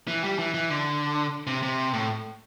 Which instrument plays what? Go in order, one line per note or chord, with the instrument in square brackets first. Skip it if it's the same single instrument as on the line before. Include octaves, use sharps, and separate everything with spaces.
[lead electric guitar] E3
G3
E3
E3
D3
C3
C3
A2